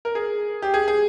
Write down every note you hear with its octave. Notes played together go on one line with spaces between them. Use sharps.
A#4
G#4
G4
G#4
G#4